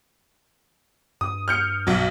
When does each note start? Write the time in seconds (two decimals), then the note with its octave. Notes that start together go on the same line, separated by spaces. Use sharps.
1.21 G2 D#6
1.48 F6 G6 C#7
1.87 B1 F#3